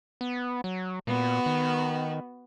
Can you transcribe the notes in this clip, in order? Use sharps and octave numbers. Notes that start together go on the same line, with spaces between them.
B3
F#3
A#2 B3 F#4
D#3